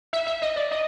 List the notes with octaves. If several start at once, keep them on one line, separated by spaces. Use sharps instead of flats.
E5
E5
D#5
D5
D#5